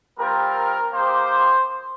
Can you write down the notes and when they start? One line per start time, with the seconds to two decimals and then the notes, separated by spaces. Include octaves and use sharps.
0.17 G3 C4 F4 A#4
0.92 A#3 D#4 G4 C5